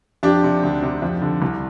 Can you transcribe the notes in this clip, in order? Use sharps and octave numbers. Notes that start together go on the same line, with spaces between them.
F2 D4 G4
C3
D2
C3
F2
D3
C2